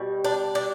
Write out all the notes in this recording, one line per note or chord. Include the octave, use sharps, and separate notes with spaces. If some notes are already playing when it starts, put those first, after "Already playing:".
Already playing: B2 G3
D4
D4